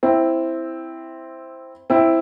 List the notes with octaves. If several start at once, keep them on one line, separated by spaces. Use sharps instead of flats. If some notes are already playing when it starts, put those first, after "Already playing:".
C4 E4
C4 E4